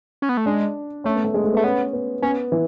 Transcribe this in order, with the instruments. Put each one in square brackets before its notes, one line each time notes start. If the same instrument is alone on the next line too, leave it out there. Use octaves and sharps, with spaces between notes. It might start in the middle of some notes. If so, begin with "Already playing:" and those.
[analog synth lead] C#4
B3
A3
[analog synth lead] G#3 [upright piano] D4
[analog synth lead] A3 [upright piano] C#4
[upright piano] B3
A3
G#3
A3
B3
[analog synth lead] A3
[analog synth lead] B3 [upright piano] C#4
[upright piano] B3
[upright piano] B3 [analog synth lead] C#4
[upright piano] E3